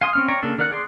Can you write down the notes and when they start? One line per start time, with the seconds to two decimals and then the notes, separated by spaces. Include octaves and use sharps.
0.01 F5 G#5 C6 D#6
0.13 C4 C#4 F6
0.28 C#5 D5 G5 A#5 C#6
0.43 C#3 A#3 D4 A4
0.58 D#3 A#4 D5 F#5 F#6
0.71 G#4 D5 C6